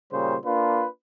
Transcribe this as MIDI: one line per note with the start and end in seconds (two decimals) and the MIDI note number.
0.11 0.35 46
0.11 0.35 49
0.11 0.35 55
0.11 0.35 72
0.44 0.85 58
0.44 0.85 62
0.44 0.85 65
0.44 0.85 71